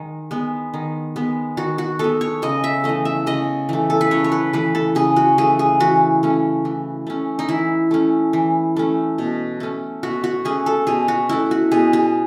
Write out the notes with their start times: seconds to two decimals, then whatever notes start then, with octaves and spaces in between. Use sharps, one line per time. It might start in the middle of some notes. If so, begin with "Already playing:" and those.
Already playing: D#3 G#3
0.31 G#3 B3
0.74 D#3
1.16 G#3 B3
1.57 D#3 F#4
1.78 F#4
1.99 G#3 B3 A4
2.21 C#5
2.42 C#3 D#5
2.64 E5
2.84 E3 A3 D#5
3.05 E5
3.26 C#3 D#5
3.69 E3 A3
3.90 A4
4.01 B4
4.11 C#3 C#5
4.24 C#5
4.32 B4
4.53 E3 A3 B4
4.75 A4
4.95 C#3 G#4
5.16 F#4
5.38 E3 A3 G#4
5.59 G#4
5.80 E3 F#4
6.23 A3 C#4
6.65 E3
7.07 A3 C#4
7.39 D#4
7.49 E3 E4
7.91 A3 C#4
8.33 E3
8.76 A3 C#4
9.18 B2
9.60 A3 C#4
10.03 B2 F#4
10.24 F#4
10.45 A3 C#4 G#4
10.66 A4
10.87 B2 G#4
11.08 F#4
11.29 A3 C#4 E4
11.51 F#4
11.72 B2 G#4
11.93 G#4